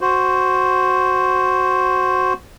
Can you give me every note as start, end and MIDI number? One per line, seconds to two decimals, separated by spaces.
0.01 2.33 66
0.01 2.33 72